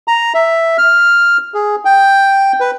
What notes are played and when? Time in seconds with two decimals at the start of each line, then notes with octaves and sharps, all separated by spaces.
0.08 A#5
0.34 E5
0.78 F6
1.54 G#4
1.85 G5
2.60 B4